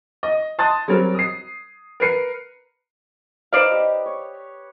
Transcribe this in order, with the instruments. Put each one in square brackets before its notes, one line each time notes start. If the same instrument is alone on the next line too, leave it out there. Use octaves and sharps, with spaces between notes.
[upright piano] D#5
A5 C6 D#6 F#6 A6
F#3 G3 C4 A#4
D#6 C7
A#4 B4 C7 C#7
[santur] D#4 B4 D#5 [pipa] C5 D5 F5
[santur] G4 D6
C#5